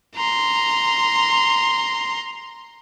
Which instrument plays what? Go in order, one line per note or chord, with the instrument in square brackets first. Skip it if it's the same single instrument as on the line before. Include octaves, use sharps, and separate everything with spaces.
[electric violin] A#5 C6